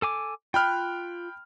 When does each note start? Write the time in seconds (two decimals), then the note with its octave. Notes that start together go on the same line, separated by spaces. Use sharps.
0.02 A4 G#5 D6
0.54 F4 G5 B5 F6 F#6